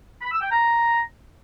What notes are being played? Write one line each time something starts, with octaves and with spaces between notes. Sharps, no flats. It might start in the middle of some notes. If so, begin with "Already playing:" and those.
B5
E6
G5
A#5